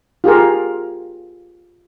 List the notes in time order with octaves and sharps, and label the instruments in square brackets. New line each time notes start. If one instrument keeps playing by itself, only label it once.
[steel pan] F4 G4 G#4 A#4